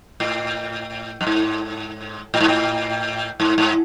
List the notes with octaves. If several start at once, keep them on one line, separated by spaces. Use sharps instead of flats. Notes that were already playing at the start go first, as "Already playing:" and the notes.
A2
F#2
G#2
A2
G#2
A2
G#2
G#2